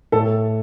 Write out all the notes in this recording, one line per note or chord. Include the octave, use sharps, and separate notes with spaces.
A2 A3 A4